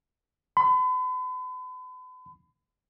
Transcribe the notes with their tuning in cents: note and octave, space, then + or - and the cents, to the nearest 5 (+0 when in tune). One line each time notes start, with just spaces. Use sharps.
B5 +40